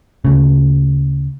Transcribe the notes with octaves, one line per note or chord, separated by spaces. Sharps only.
D2 C#3